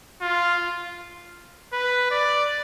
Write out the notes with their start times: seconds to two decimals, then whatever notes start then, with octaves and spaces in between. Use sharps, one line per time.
0.21 F4
1.73 B4
2.11 D5